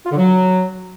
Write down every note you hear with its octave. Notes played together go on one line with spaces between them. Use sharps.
F4
D3
F#3